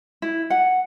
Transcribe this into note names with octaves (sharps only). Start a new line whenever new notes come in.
E4
F#5